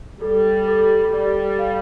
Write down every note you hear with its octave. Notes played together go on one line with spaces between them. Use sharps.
G3 A4
A4
G3 D5
F5